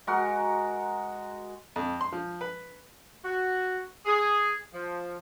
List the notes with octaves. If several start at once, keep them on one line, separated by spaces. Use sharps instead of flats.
G#3 F#4 A#4 F#5
F2
C6
F3
B4
F#4
G#4
F3